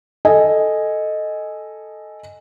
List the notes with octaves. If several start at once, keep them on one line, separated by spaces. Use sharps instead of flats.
A4 D#5 G#5